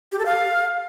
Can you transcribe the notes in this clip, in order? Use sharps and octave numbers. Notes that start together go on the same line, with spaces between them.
G4
A4
F5